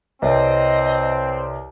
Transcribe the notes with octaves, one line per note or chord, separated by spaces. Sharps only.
C2 C4 B4 C#5 D#5 E5